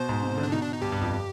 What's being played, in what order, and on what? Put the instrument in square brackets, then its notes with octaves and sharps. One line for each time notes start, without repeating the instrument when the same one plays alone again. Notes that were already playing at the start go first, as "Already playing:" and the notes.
Already playing: [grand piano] B2 [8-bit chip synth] C5
[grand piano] G#2
C3
D3
[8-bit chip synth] D4
[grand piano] B2 [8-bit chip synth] D#4
[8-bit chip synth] D4
D#4
[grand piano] G2 [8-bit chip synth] G4
[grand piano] G2
F2